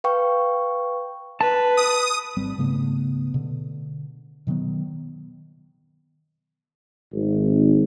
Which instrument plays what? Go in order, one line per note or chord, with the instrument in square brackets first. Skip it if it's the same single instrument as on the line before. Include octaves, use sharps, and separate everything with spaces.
[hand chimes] B4 F5 G5 C#6
[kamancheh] B4 [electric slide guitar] A5
[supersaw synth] D#6
[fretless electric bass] G#1 G3 C4
G#2 C#3 A3 B3
B2 D3
B2 D#3 F#3 B3
[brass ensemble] G#1